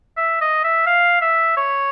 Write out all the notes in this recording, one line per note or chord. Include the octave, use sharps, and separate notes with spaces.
E5
D#5
E5
F5
E5
C#5